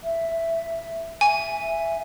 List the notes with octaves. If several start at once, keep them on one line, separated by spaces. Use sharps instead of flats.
E5
E5 G#5